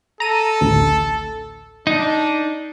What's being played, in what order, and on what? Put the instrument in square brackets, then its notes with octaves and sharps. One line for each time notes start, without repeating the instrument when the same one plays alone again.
[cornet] A4 [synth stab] A#5 D#7
[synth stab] A1 D2
[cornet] D4 [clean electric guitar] D#4